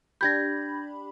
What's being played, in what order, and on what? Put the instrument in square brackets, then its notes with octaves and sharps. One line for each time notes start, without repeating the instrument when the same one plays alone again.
[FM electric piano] D4 G4 B5 [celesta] G6 G#6 A#6